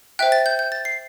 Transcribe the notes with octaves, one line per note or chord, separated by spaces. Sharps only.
C5 E5 G5 F#6
A6
G6
G6
A6
C7